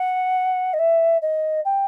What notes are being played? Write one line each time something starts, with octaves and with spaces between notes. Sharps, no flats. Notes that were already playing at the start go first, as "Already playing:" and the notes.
Already playing: F#5
D#5
E5
D#5
G5